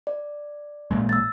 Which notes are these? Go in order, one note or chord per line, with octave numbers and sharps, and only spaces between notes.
D5
A1 A#2 G#3
E6 A6